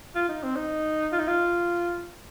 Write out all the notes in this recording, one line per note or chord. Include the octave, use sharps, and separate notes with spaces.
F4
D#4
C4
D#4
F4
D#4
F4